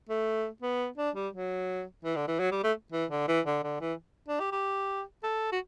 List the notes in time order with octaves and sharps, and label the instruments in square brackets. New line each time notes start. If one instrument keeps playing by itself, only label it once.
[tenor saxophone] A3
B3
D4
G3
F#3
E3
D3
E3
F#3
G3
A3
E3
D3
E3
D3
D3
E3
D4
G4
G4
A4
F#4